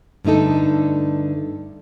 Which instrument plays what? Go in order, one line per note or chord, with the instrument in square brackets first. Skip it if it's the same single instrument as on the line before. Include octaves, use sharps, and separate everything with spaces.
[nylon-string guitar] G2 D3 A3 D#4 A4